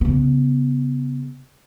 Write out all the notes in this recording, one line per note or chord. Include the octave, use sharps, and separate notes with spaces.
C#3 B3